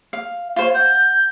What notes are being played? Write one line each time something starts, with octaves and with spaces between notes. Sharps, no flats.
F5
F4 C5 C#5
F#5 G6